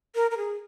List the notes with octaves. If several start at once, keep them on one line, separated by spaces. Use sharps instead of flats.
A#4
A#4
G#4